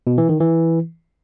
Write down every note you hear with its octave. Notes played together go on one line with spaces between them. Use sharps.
B2
E3
D#3
E3